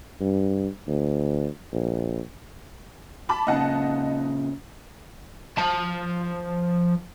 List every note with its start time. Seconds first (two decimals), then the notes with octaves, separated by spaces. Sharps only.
0.21 G2
0.88 D2
1.73 A#1
3.29 A5 B5 D6
3.47 A#2 C#3 D#4 F#5 A5
5.58 F3 A5